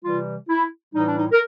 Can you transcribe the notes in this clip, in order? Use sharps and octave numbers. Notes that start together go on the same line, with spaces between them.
C3 E3 G3 F4
E4
A2 E3 G3 D#4
D4
D#4
A#4